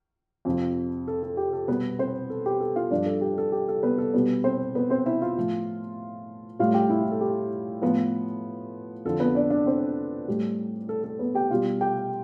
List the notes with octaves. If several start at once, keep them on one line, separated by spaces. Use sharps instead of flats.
F2 C3 F3
A4
A4
G4
A4
B2 G3 B3 B4
C4 C5
A4
G4
A4
F4 F5
G2 F3 D4 D5
A4
G4
A4
G4
A4
B3 B4
A4
B2 G3 B3 B4
C4 C5
B3 B4
C4 C5
E4 E5
F4 F5
A2 F3
A2 G3 F4 F5
G4 G5
E4 E5
A4
G4
A2 F3 B3 B4
F2 D3 F3 A4
B3 B4
D4 D5
D4 D5
C4 C5
A2 G3
A4
A4
B3 B4
G4 G5
B2 G3 F4 F5
G4 G5